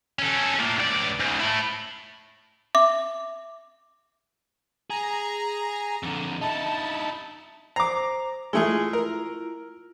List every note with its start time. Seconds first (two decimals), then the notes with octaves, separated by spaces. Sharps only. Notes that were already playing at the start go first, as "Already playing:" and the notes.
0.19 C#4 A4
0.59 A2 A#3
0.79 C#2 D5
1.20 G#2 C#3
1.40 A3 E4
2.75 E5 D6
4.90 G#4 A#5
6.03 F2 D3
6.41 D#4 E4 A5
7.76 C5 A#5 D6
8.53 G#3 A3 E4 F4 G#4
8.93 A#4